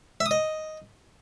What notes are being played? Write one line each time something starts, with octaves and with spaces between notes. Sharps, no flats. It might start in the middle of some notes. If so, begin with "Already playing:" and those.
E5
D#6
D#5